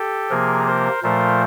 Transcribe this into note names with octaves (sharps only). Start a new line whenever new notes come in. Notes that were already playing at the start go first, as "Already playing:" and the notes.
Already playing: G4 A4
C3 F3 A#3 G#4 A#4
A#4 C5
A#2 F3 A3 A#4 C5